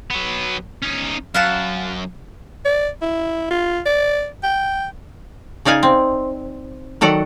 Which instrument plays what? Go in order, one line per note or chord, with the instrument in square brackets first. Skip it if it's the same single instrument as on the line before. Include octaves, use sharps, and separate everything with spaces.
[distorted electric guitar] F#3 B3
C#4 D#4
[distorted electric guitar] F#2 [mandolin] F5 F#5 A5
[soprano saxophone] D5
E4
F4
D5
G5
[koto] C#3 D#4 D5 F5 G#5
C4
D#3 F#3 A4 D5 F#5